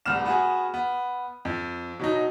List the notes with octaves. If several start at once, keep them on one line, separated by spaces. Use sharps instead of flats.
D1 C2 B3 F6 E7
B3 F#4 G#4
B3
F2
B2 F#3 D#4